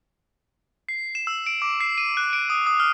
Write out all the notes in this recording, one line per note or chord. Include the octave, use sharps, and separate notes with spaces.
C7
E7
E6
D7
D6
C7
D#7
F#6
D7
D#6
D#6
F6